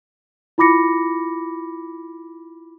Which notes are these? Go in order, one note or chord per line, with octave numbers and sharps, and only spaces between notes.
E4 F4 B5 D6 A#6 C#7